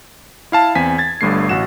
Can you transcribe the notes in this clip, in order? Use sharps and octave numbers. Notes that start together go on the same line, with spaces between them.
E4 F5 A5
E2 C4 G#5 B6
G#6 A6
G1 G2 A3 C7
A1 F#4 E7